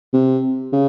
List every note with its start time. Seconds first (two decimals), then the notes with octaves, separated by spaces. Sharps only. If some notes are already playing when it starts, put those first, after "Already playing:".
0.13 C3
0.73 C#3